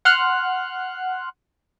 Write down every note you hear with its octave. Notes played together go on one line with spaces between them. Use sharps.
F#5 C6 F6 F#6